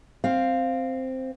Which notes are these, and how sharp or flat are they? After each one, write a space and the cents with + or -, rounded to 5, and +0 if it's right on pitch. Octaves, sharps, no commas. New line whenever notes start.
C4 +0 F5 +0